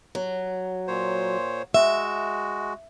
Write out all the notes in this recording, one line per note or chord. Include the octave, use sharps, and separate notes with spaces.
F#3
A#2 C5 C#5
G#3 F#4 E5